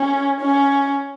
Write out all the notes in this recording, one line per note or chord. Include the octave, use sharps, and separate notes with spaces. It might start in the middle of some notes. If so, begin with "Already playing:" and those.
Already playing: C#4
C#4